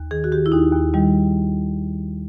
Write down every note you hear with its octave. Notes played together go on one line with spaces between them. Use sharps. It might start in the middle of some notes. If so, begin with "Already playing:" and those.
Already playing: D#2
D#3 G#4
F#4
D#3 G4
E4
D#2 D#4
D#2
D#3 G3